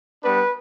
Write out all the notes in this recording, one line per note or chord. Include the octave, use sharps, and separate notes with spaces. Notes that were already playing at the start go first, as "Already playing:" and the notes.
G3 B3 D4 B4